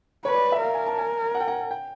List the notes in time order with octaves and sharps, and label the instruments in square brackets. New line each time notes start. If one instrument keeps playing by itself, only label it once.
[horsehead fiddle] B4 [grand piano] C#5
[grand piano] D5
E5
[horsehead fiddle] A#4 [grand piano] F5
[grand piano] G#5
A5
G#5
F#5
G5
F#5
G5